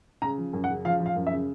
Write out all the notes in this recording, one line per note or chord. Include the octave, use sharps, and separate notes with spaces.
C#3 A#5
F3
F#2
F#5
C#3
F3 F5
F3
F5
F#2
E5
C#3